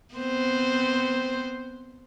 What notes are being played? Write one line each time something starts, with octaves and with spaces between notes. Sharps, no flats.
B3 C4 C5